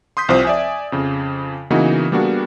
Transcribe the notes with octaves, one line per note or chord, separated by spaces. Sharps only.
C6 D#6 G6 B6
C2 F3 C4 C5 D#6
D5 E5 G#5
F2 C#3
C#3 E3 A#3 B3 D#4 F#4
G3 A#3 B3 D4 F#4 G#4